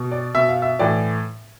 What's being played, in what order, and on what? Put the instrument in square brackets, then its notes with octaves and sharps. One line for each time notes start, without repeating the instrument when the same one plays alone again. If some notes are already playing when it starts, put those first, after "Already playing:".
Already playing: [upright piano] B2
D5
B2 E5
F5
E5
A2 E3 D5